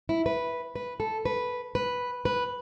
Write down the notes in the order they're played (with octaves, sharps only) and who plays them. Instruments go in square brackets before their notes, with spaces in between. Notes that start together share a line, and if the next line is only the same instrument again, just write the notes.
[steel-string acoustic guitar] E4
B4
B4
A4
B4
B4
B4